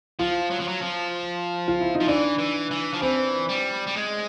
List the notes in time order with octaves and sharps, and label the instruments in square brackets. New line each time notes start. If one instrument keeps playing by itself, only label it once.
[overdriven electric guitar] F3 [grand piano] F4
[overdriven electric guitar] F#3
F3
F#3
F3
[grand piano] F4
E4
D#4
[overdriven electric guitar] F3
[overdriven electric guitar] E3 [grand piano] D4
[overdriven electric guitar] E3
E3
F3
[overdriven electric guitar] E3 [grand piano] C4
[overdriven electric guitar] G3
G3
G#3